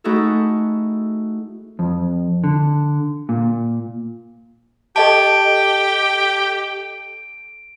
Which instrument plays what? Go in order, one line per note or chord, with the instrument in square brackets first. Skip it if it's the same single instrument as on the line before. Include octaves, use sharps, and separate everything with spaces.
[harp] A3 D#4 E4 F#4 G#4 A4
[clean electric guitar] F2
D3
A#2
[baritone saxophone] G4 [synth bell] A4 D#5 A5 [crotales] D7